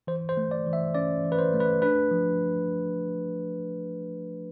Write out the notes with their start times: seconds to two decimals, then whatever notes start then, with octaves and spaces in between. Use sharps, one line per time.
0.07 E3 C5
0.29 C5
0.37 A3
0.51 D5
0.66 E3
0.73 E5
0.95 C#4 D5
1.24 E3
1.32 B4
1.39 C5
1.54 A3
1.60 B4
1.82 D4 B4
2.11 F3